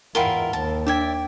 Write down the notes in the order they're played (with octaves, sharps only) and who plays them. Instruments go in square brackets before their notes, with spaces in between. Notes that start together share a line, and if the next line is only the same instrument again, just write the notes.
[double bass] E2 G#2 [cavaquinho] E4 F4 A#4 [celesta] F#5 G5 G7
[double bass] D#2 [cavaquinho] A5
[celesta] D4 G#6 [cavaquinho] D5 E5 [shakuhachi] G5